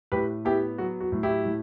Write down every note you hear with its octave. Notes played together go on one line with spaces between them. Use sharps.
A2 G4 B4
B3 E4 G4
F#3 F#4
F#4
A2
E4 G4
A2